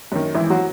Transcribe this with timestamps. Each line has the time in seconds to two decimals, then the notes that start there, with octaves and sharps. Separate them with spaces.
0.12 F#2 D#3
0.35 G#1 E3 E4
0.50 F#3 F#4